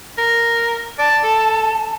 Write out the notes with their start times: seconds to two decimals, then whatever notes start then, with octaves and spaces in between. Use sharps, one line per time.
0.18 A#4
0.99 D5 A5
1.23 A4